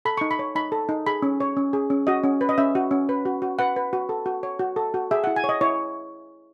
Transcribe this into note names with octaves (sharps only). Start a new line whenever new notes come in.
A4 B5
C#6
D#4
B5
C#5
D#4 B5
A4
D#4
G#4 B5
C#4
C#5
C#4
G#4
C#4
F#4 D#5
C#4
B4
D#5
C#4 E5
F#4
C#4
B4
F#4
F#4
B4 F#5
B4
F#4
A4
F#4
C#5
F#4
A4
F#4
G#4 E5
F#5
E4
G#5
C#5
D#5
E4 C#5